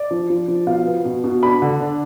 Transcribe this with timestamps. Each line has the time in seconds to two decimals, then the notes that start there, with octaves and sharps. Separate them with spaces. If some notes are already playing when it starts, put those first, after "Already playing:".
Already playing: D5
0.11 F3
0.30 F3
0.48 F3
0.67 B2 F5
0.86 B3
1.05 B2
1.24 B2
1.42 D4 B5
1.62 D3
1.80 D4